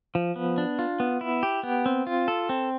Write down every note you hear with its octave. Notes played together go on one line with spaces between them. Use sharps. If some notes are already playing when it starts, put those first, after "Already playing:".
F3
B3
D4
F4
B3
E4
G4
B3
C4
F4
A4
C4